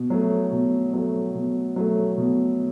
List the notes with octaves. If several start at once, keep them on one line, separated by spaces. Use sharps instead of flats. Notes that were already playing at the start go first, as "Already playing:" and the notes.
Already playing: B2
F#3 A3
B2
F#3 A3
B2
F#3 A3
B2